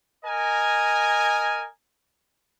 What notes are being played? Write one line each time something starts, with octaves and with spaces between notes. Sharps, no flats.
A#4 D#5 G#5